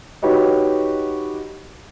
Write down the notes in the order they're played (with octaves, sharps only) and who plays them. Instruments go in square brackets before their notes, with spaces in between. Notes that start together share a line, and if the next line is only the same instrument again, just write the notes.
[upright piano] D#4 F#4 G4 B4 C#5 D#5